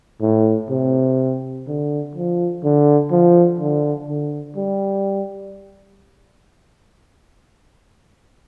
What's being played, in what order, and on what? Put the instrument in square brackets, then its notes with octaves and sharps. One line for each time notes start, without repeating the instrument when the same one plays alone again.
[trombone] A2
C3
D3
F3
D3
F3
D3
D3
G3